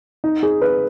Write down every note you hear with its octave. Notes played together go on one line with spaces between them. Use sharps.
D#4
G#4
B4